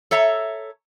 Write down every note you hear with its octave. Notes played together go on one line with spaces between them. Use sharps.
A4 C#5 E5 A#5